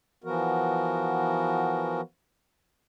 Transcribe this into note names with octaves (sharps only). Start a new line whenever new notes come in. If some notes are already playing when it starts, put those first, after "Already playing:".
E3 F3 B3 F#4 A#4